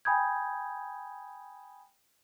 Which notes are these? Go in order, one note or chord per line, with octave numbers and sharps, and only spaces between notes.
G5 G#5 B5 D#6 G6 G#6